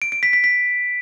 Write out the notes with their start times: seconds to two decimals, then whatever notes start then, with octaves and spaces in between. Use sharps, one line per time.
0.02 D7
0.12 D7
0.23 B6
0.33 B6
0.44 B6